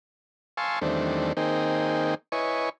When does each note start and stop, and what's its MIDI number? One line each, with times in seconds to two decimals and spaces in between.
0.57 0.79 77
0.57 0.79 80
0.57 0.79 81
0.57 0.79 84
0.57 0.79 85
0.57 0.79 88
0.82 1.33 40
0.82 1.33 51
0.82 1.33 55
0.82 1.33 57
0.82 1.33 60
0.82 1.33 62
1.37 2.15 51
1.37 2.15 58
1.37 2.15 60
1.37 2.15 63
1.37 2.15 68
1.37 2.15 79
2.32 2.69 64
2.32 2.69 71
2.32 2.69 73
2.32 2.69 75
2.32 2.69 80
2.32 2.69 85